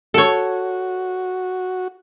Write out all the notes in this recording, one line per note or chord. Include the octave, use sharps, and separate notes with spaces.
F#4 A4 C#5